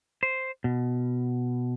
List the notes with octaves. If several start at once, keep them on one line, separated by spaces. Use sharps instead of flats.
C5
B2